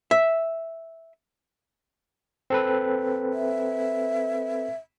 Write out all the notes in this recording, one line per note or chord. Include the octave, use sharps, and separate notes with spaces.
E5
C4 A4 B4
E5